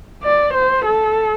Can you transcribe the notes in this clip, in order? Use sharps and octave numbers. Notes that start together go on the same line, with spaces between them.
D5
C5
A4